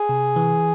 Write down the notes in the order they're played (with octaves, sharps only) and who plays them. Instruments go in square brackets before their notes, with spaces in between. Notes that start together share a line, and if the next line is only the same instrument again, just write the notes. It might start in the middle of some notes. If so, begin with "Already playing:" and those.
Already playing: [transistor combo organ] G#4
[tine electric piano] C3
E3